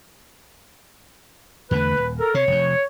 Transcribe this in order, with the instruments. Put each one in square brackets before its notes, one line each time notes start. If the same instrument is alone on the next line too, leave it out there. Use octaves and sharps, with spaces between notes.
[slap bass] E2 D3 A3 [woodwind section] B4
[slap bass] D#1
[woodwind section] A4 A#4
[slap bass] C3 [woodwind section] C#5
[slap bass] F1 F2